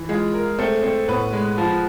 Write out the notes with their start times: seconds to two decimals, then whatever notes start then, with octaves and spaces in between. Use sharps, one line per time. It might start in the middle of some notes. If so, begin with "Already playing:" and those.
Already playing: E3
0.09 G#3 F4 G#4
0.34 A#4
0.59 A3 C4 A4
0.83 C4
1.08 A2 B3 B4
1.33 G#3
1.58 F3